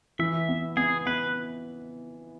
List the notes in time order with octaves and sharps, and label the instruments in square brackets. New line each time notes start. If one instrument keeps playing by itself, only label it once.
[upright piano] E3 [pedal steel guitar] E5
[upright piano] B3
[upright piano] B3 [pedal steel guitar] G#4
[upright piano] B3 [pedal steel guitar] B4